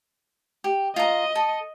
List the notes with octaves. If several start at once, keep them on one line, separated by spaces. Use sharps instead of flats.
G4
F4 D#5 A#5
A4